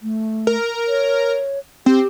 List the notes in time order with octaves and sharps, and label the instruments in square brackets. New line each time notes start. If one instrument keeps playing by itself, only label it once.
[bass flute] A3
[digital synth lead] A#4
[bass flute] C#5
[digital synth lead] C4 [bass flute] G4